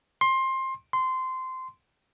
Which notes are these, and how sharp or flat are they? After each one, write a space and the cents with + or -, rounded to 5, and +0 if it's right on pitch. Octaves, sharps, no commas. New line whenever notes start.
C6 +20
C6 -15